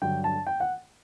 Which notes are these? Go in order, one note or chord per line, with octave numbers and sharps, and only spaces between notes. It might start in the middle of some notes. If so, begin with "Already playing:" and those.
G2 D3 F#3 G5
A5
G5
F#5